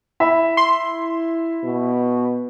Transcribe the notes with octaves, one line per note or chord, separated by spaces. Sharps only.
E4 E5 B5
C6
B2